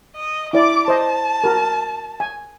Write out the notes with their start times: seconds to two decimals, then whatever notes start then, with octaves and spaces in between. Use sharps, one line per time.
0.16 D#5
0.53 E4 D5 D6
0.88 C5 D#5 A5
1.44 F#4 A#4
2.20 G#5